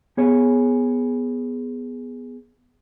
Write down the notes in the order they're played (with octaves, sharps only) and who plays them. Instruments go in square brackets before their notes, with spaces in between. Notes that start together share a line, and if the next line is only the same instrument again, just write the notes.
[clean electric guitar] B3 G#4 C#5